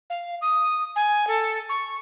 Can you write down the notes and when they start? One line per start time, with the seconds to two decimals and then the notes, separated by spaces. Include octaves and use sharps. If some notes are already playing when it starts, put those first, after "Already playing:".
0.10 F5
0.41 D#6
0.96 G#5
1.27 A4
1.69 C#6